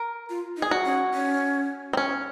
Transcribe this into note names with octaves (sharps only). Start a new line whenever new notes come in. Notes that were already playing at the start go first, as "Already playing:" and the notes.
Already playing: A#4
F4
D#4
G#4
F#4
C#4
C#4
C4
C#4